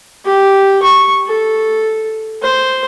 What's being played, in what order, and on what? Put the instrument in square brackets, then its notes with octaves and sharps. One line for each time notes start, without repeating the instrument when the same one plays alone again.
[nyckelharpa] G4
C#6
A4
C5